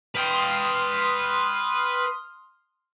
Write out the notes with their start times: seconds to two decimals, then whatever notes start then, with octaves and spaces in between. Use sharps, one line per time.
0.15 B4 G5 C6 D#6 F6